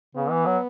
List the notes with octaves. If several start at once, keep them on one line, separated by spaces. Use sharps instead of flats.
C#3 B3
E3
F#3